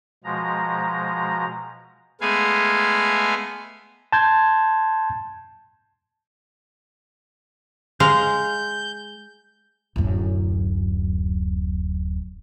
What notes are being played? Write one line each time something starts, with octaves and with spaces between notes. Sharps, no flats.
B2 F3 G#3 A#5
G#3 A3 B3 G#4 F5 G#5
A5 C6 G6 G#6
G#3 F5 A#5 G6
D1 F#2